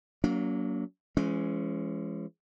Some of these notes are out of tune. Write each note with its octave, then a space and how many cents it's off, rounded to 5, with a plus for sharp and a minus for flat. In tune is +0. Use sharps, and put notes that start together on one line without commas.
F#3 +0 A#3 +0 D4 -45
E3 +40 G#3 +5 C#4 +0